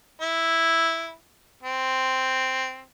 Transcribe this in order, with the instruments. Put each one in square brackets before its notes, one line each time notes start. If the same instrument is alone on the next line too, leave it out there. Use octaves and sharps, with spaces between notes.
[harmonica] E4
C4